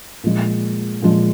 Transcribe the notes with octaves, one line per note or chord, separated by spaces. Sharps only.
A#2 F3 G#3
A#2 F3 G#3